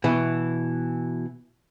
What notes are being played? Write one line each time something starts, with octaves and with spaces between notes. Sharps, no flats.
B2 E3